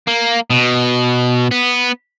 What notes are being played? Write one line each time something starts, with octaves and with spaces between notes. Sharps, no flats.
A#3
B2
B3